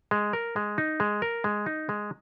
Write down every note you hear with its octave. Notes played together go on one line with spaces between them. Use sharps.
G#3
A#4
G#3
D#4
G#3
A#4
G#3
D#4
G#3